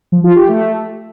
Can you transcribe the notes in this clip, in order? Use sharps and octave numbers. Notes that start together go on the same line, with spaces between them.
F3
F4
G4
A3